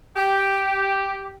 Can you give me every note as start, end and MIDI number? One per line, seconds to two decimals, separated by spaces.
0.17 1.35 67
0.17 0.93 79